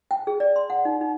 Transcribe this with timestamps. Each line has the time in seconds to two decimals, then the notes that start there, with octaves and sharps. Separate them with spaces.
0.11 G5
0.27 G#4
0.40 D5
0.56 C6
0.70 F#5
0.85 D#4
1.01 D#4